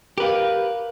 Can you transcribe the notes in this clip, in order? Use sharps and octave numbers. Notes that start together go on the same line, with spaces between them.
G4 A#4 B4 F5